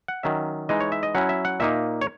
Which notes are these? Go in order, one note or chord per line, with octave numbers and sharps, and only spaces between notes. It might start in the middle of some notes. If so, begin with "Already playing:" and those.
F#5
D#3 F#3 C#4 E5
E3 G#3 D#4 D#5
C#5
E5
D#5
F#3 C#4 E4 F#5
E5
F#5
A#2 A#3 D#4 E5
C#5